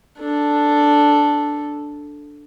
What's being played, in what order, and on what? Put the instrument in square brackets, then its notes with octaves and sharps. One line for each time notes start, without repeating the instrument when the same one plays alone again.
[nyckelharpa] D4 A4